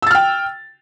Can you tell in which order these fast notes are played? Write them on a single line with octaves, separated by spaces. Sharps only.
E6 A6 F6 G5